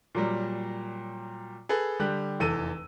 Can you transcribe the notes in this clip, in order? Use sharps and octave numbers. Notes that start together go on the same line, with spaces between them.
A#2 F#3 G3
G#4 A4 B4
D3 G3 G4 F#6
F1 E2 A4 E6 D#7